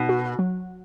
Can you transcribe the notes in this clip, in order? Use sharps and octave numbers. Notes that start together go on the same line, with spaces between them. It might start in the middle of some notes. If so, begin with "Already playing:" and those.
Already playing: B2 D#4
F#4
F#3